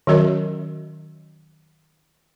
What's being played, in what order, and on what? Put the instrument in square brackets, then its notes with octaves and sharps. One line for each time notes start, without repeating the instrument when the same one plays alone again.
[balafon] D#3 F#3 C#4 F#4 A#4 D#5